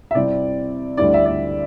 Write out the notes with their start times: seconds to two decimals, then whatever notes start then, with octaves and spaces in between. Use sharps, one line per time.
0.11 E5
0.15 C3 G3 C4 E4 D5
0.97 D2 D3 G3 E4 D5
1.14 E5
1.25 D5